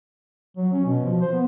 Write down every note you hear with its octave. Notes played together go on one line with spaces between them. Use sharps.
F#3
C#4
B2
F3
C5
B3